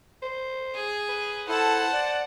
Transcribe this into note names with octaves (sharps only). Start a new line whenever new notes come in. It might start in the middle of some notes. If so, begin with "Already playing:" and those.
C5
G#4
B4
E4 A4 C5 F#5 A5
D5